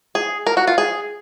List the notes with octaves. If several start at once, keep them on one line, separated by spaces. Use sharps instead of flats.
G#4
A#4
F#4
F4
G#4